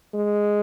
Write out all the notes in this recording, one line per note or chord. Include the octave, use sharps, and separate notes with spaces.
G#3